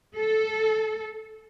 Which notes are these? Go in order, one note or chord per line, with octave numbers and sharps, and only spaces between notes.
A4